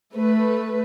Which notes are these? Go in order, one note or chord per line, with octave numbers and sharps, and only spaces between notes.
A3 B4